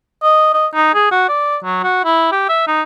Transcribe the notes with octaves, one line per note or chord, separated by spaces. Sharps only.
D#5
D#5
D#4
G#4
F#4
D5
F#3
F#4
E4
G4
E5
D#4